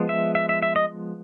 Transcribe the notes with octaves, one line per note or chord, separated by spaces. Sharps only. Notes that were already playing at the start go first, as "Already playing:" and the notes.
Already playing: F3 G#3 B3
E5
E5
E5
E5
D#5